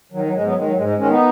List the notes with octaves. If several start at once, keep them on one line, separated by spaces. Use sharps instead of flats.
D#3 F#3
F#3
G#2 G#3
F#3 B3
D#3 G#3
F#3
G#2 G#3
G#3
D#3 G#3 C#4
B3 D#4